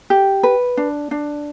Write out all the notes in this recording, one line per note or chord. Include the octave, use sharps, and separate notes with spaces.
G4
B4
D4
D4